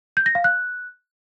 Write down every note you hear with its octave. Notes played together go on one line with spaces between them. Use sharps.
G6
A#6
F5
F#6